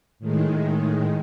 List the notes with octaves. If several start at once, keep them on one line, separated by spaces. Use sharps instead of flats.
A2 D#3 G#3